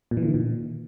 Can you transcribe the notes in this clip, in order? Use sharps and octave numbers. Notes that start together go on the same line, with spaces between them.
A#2
E3
D3
D#3
A#2